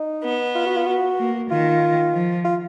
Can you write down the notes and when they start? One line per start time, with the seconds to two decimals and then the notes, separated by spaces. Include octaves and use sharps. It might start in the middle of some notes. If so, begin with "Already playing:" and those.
Already playing: D#4
0.23 B3
0.55 F4
0.66 F#4
0.76 F4
0.86 F#4
1.18 A#3
1.50 D#3 F4
2.14 F3
2.44 F4